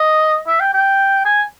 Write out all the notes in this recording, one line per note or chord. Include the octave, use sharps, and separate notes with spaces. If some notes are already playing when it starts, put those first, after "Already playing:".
Already playing: D#5
E5
G5
G5
G#5